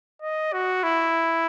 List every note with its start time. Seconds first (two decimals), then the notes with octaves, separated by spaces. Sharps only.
0.22 D#5
0.53 F#4
0.83 E4